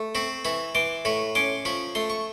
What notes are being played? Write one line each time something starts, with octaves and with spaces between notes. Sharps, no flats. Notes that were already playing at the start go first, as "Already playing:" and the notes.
Already playing: A3
C4 B5 C#6
E3 B5 C#6
E3 C6 D6
A2 B5 C#6
C#4 C6 D6
F3 B5 C#6
A3 C6
C#6